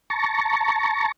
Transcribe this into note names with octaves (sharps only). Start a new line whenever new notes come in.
A5 A#5 C#6